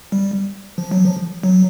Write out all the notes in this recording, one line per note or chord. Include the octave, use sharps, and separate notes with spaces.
G3
F3
F#3
F3
F#3